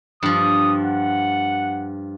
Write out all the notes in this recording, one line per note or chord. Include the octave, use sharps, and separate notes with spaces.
G2 F3 D#6
F#5